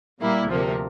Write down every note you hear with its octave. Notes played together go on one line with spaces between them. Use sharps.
A#2 G3 A#3 E4
D2 C3 F3 A#3